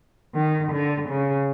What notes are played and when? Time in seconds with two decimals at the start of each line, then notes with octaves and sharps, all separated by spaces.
0.35 D#3
0.72 D3
1.09 C#3